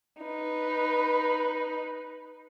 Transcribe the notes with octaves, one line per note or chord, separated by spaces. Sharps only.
D#4 B4